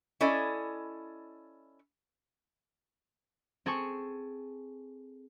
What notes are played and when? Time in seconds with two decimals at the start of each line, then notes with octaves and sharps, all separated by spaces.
0.21 C#4 E4 A4 D5 D#5
3.66 C4 G#4 A4 G#5 C#6